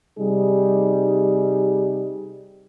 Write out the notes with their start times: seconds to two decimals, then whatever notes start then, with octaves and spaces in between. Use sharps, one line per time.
0.18 C3 G3 D#4 G#4